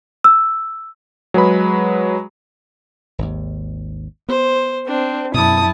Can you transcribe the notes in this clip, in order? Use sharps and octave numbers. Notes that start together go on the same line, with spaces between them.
E6
F#3 G#3 G#4 B4 B5
G#1 D#2
B3 C5
C4 D4
F#2 B2 E4 A5 D#6